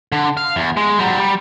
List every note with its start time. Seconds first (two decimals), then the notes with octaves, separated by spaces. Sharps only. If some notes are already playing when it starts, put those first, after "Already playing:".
0.12 D3
0.37 F5
0.56 E2
0.77 G#3
0.99 F#3 G3
1.20 G3